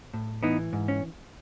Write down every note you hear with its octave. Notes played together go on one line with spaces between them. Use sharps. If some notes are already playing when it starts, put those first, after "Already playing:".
A2
E3 B3 D#4
G#2
C#4